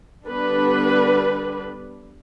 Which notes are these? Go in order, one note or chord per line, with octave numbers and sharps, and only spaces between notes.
D3 G3 B3 D4 B4